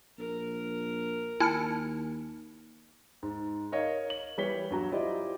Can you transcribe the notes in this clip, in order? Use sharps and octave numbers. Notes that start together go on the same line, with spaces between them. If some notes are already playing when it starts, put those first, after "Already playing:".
A#1 A#4
D#2 E4 G#5 A5 F6 C#7
G#2
A#4 C#5 D#5 F5
F#7
E3 G3 B4 C#5 B6 G7
G2 F#3 A#5
E4 F4 G4 C5 D5 D#5